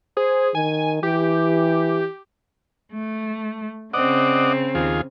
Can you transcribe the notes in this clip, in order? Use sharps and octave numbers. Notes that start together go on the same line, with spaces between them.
G#4 C5
D#3 G#5
E3 G4
A3
C#3 C4 D5 D#5 F#5
D#2 F4 G#4